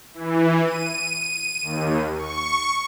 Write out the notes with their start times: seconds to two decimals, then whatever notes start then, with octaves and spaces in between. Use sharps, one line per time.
0.14 E3
0.65 D#7
1.63 D#2
2.18 C#6